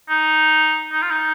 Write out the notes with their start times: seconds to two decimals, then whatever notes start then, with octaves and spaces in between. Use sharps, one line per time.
0.09 D#4
0.92 D#4
1.02 F4
1.10 D#4